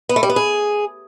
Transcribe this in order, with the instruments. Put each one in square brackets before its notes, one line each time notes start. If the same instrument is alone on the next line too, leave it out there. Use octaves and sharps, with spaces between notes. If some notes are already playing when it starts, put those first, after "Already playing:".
[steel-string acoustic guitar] B3
A3
G3
B3
G#4